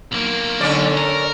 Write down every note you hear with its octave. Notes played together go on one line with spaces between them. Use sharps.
B1 A#3
B1 D3 C#4 D5
A#4